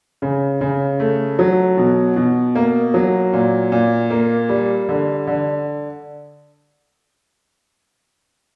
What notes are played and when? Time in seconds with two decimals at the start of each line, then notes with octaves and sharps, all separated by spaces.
0.22 C#3
0.61 C#3
1.00 A3
1.39 F#3
1.78 B2
2.16 B2
2.55 A#3
2.94 F#3
3.33 A#2
3.72 A#2
4.10 A#3
4.49 G3
4.89 D3
5.27 D3